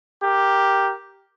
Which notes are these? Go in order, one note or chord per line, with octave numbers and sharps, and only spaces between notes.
G4 A#4